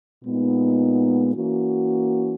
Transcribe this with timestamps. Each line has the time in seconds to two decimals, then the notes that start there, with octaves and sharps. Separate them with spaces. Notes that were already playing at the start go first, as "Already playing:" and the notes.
0.24 A#2 G#3 B3 D#4
1.34 E3 A#3 C#4 F#4